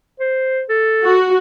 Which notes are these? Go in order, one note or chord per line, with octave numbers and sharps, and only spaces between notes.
C5
A4
F#4